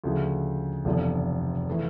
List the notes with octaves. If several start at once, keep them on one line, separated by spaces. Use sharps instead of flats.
D2 C#3 F3
F1 E2 D3 F3
E3 A3